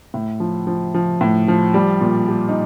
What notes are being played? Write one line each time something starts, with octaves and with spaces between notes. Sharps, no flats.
A2
F3
F3
F3
A2
F3
G3
A#2
G3
D#4